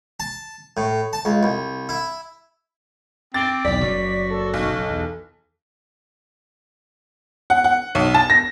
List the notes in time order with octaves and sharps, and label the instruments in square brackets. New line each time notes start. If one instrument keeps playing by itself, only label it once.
[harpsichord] A5
A2
A5
C#2
C2
E4
[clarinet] C4 [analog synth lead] D6 [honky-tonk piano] A6
[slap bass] B1 E2 [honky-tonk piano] D5 [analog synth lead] B6
[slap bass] F#1 G3 [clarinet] F#4
[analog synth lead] A4
[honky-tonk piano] B1
[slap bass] E2
[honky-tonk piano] F#5
F#5
B1
A5
A#6